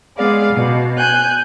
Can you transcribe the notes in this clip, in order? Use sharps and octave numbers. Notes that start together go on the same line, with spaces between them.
G#3 B3 G#4 D5 F5
B2
G#5 F#6 G6